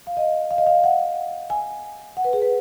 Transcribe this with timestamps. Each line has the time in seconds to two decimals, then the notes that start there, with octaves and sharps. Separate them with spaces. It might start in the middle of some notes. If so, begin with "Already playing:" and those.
0.07 F5
0.17 D#5
0.51 F5
0.58 D#5
0.67 F5
0.84 F#5
1.50 G#5
2.17 F#5
2.24 B4
2.33 G#4
2.42 B4